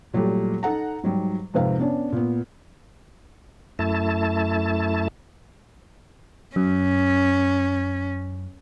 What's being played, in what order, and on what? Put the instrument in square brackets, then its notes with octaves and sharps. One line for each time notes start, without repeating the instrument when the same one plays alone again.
[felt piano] A#2 F#3 G3 A3 G4
D#4 A4 F#5 A#5
G#2 F#3 G3
F2 G#2 C3 B4 F5
B3 C#4 D4
A#2 B3
[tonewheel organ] F#2 A3 E4 A5
[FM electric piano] F#2 [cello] C#4